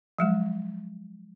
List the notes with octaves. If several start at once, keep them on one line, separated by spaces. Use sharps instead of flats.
F3 F#3 G#3